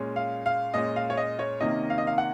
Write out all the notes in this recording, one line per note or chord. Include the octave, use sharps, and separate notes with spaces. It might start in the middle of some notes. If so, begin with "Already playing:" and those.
Already playing: A#2 G#3 C#4
F5
F5
A#2 G#3 C#4 D#5
F5
C#5
D#5
C#5
C3 D#3 A#3 C#4 D#5
F5
D#5
F5
F#5